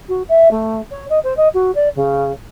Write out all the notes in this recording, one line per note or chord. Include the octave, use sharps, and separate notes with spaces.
F#4
E5
A3
C#5
D#5
C5
D#5
F#4
D5
C#3